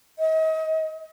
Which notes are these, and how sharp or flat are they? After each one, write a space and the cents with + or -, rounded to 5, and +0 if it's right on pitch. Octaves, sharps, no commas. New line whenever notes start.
D#5 +35